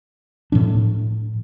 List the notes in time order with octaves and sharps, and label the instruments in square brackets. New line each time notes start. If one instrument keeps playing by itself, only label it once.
[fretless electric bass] A2 F3 D4